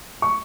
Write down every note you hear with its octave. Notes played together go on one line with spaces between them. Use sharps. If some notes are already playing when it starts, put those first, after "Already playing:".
C#6